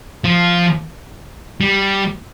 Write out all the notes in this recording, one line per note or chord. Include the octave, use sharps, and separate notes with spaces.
F3
G3